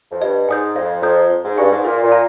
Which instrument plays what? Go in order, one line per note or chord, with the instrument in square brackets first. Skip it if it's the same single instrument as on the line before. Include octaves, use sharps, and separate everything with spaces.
[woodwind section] F2
[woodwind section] G2 [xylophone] D#5
[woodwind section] G#2 [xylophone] G#5 D#6 G6
[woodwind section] F2 [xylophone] F5
[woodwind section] F2 [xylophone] A#5 D#6 G6
[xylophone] C5
[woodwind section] G#2
[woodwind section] G2 [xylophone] F5 G#5 C#6
[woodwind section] G#2
[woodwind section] A#2 [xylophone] A#4
[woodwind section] A#2
[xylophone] F5 A#5